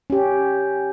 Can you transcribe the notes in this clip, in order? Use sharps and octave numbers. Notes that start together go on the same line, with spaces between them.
C#4 G4